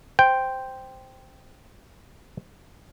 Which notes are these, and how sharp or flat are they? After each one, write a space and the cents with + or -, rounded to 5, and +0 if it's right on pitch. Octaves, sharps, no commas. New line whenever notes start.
C5 -5 G5 +0